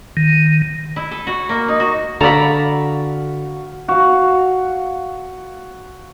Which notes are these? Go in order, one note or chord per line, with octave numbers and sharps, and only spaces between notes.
D#3
E4
A4
F#4
A#3
D#4
F#4
D3 F#4 A4 D5 F5 A#5 B5 C#6
F#4 F5